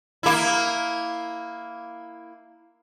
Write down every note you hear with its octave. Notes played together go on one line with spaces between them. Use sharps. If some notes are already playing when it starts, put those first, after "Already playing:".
A#3 E4